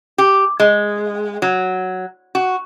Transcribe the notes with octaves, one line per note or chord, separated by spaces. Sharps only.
G4
G#3
F#3
F#4